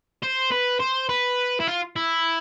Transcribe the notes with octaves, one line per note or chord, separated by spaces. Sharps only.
C5
B4
C5
B4
E4
F4
E4